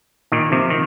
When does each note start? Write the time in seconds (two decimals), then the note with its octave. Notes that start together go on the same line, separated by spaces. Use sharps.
0.32 A#2 D#3
0.52 C3 F3
0.70 D#3